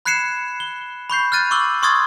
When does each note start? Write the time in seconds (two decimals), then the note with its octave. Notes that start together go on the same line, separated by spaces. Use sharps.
0.05 B5 F#6 G#6 C7 C#7 E7
0.60 G7
1.10 B5 C#6 G6 C7
1.32 F6 F#6 A6 D#7
1.51 C#6 D6 E6 F#7 G7
1.83 C6 C#6 D#6 F6 G#6 A6